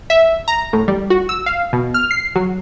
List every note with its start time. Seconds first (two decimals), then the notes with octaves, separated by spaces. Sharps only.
0.10 E5
0.48 A#5
0.73 A2
0.88 G3
1.10 F#4
1.29 E6
1.46 F5
1.73 B2
1.94 F6
2.11 C7
2.35 F#3